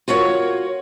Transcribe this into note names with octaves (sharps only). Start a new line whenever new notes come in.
F4 F#4 A#4 C#5